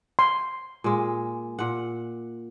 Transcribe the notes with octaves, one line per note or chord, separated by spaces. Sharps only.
C6
A#2 G#3
A#2 F#5